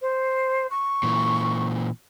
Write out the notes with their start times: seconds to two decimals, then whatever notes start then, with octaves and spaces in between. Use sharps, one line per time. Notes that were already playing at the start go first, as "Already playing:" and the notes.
0.01 C5
0.70 C#6
1.03 A#2 E3